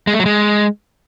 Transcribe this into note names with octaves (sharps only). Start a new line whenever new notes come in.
G#3
A3
F#3
G#3